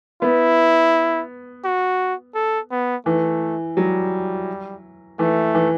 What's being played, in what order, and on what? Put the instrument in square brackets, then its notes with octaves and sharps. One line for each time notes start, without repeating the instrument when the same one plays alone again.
[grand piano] B3 [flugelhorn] E4
[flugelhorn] F#4
A4
B3
[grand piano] E3 [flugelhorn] A3
[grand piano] F#3 [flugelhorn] G3
[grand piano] E3 [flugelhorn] A3
[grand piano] E3